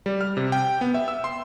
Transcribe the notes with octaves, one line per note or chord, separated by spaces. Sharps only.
G3
F6
C3
G5
B3
E5
E6
C6